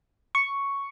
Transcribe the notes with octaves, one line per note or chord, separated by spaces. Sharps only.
C#6